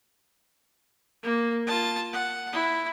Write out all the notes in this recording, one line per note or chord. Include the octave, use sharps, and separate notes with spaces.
A#3
F4 A5
F#5
E4